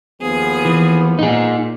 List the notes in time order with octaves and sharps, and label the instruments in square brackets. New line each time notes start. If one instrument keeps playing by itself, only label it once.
[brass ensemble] D#2 F3 B3 [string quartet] G#4
[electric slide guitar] E3
[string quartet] A#2 [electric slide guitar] D#4 G#4